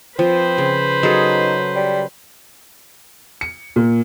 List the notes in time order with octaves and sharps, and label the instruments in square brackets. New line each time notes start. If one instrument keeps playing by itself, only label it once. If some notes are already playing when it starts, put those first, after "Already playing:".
[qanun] F3 [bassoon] C4 [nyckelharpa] B4 C5
[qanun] C#3
[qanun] F#3 G#4 A4 [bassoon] D#4
[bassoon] G3
[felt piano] C#7
A#2